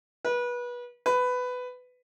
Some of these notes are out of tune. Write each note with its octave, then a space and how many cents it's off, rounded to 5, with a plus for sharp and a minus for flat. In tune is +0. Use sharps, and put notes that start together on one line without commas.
B4 -25
B4 +15